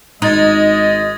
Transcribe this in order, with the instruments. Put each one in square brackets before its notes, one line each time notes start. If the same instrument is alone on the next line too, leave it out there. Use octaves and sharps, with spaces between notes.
[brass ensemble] G#1 D#5 [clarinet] G#3 [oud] D#4 [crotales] D#6 G#6 A6